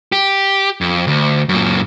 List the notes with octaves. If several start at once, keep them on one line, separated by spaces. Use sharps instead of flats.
G4
F2
D2
F#2 A#2